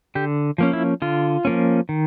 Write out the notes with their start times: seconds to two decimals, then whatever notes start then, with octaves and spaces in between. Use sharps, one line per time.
0.15 D3 G4
0.58 F3 A#3 C#4
0.73 E4
1.02 D3 F4
1.45 F3 A#3 C#4
1.89 D#3